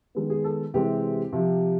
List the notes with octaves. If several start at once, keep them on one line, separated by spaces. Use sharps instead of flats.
D#3 G#3 B3
G#4
A4
C3 E3 G#3 C4 G4
C3 F3